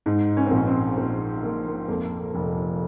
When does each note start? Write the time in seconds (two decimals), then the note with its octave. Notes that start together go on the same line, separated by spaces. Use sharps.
0.06 G#2 D#4
0.37 C#4
0.46 C4
0.51 A#1
0.57 C#4
0.67 C4
0.98 A#1
1.43 F3 A#3
1.66 A#3
1.88 F2 A#3
2.35 F1